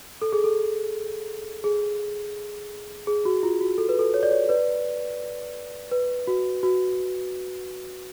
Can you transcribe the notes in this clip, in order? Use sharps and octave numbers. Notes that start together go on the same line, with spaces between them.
A4
G#4
A4
G#4
G#4
F#4
F4
F#4
A4
B4
A4
C#5
D5
C#5
B4 D5
B4
F#4
F#4